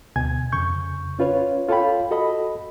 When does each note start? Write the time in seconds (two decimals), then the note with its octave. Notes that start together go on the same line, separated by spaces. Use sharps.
0.16 D2 B2 G#5 G#6
0.52 F2 C#3 C#6 G6
1.19 C#4 F4 B4 C#5
1.69 F4 A4 C#5 F5 G5 B5
2.11 F#4 A4 D#5 B5